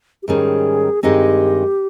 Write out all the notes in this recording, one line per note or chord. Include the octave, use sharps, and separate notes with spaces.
G4
G#2 D#3 G3 C#4 G#4
G2 D#3 G#3 C4 D#4 G4